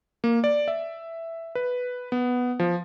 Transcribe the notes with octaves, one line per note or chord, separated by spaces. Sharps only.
A#3
D5
E5
B4
B3
F3